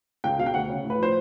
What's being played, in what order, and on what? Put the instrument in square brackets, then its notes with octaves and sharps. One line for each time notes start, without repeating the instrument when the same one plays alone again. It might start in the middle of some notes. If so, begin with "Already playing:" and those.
[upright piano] C#2 G5
B2 F5
G5
D2 F#5
C#3
A2
B4
F3 C5